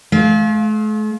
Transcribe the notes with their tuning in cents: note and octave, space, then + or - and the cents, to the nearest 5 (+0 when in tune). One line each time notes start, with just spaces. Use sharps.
A3 -45 F5 +0